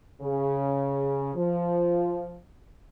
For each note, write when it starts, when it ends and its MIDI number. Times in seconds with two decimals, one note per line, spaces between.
0.21 1.33 49
1.35 2.33 53